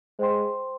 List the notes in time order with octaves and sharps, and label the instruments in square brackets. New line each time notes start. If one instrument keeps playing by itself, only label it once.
[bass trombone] G#3 [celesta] C5 G5 C6